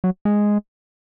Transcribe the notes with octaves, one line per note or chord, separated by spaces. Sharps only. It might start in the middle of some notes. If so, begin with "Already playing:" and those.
F#3
G#3